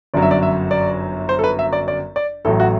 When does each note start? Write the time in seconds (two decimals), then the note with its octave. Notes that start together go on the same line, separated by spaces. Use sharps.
0.14 G1 F#2 F#3 D5
0.22 E5
0.31 D5
0.43 E5
0.71 D5
1.29 C5
1.39 A4
1.44 B4
1.59 E5
1.73 D5
1.88 D5
2.16 D5
2.45 A1 A2 F#3 A4
2.60 F#4